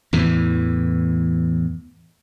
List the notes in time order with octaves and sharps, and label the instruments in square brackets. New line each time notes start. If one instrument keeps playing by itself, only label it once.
[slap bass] E2 A2 E3